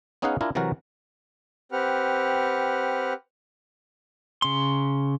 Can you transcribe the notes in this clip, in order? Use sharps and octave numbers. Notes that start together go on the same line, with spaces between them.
B3 C#4 D#4 G#4 F5 F#5
D4 E4 F4 A#4 G#5
C3 E3 F#3 F#4 A#4
C4 G4 B4 F#5 F6
C#3 C6